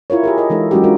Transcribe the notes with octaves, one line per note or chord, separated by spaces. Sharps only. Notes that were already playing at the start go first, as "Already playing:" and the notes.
E4 F4 A#4 C#5
G4 G#4 A#4
A#4 D#5
E3 G#3 D#4 A4
F#3 G#3 C#4 F#4 G4
G#3 D4 F4 A#4